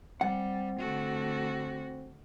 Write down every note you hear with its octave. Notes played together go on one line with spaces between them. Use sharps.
G3 C4 F#5
D3 A3 F#4